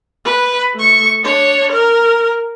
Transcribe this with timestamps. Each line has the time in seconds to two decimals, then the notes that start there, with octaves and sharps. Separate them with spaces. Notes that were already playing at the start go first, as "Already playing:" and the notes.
0.25 B4
0.75 A3 C#6
1.24 D4 C#5
1.72 A#4